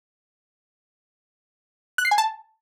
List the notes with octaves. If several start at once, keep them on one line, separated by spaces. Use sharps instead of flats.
F#6
C7
G#5
A5